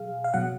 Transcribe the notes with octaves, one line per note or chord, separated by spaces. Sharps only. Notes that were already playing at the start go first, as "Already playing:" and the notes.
Already playing: B2 F#3 G#4 F5
F5
B2 F#3 F#5